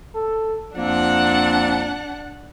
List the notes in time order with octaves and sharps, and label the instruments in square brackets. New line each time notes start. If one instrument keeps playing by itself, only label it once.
[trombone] A4
[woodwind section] F2 A#3 C4 [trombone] F3 [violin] D4 F#5